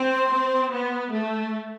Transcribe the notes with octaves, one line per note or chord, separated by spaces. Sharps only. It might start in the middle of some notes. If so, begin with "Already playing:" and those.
Already playing: C4
C6
C4
B3
A3